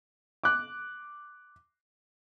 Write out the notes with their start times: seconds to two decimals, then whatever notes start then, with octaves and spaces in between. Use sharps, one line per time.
0.44 D6 F#6